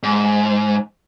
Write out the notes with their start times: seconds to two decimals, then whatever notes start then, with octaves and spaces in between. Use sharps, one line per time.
0.03 G#2